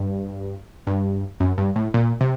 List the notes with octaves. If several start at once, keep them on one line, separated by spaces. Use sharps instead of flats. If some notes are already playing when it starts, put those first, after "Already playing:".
Already playing: G2
G2
F#2
G2
A2
A#2
C3